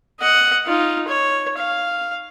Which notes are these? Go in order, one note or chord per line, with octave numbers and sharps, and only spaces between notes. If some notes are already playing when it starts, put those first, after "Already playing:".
D#5 F#5
D#4 F4
C#5
F5